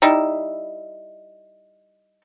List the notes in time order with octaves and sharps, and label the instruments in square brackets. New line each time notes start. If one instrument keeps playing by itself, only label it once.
[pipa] G3 D#4 E4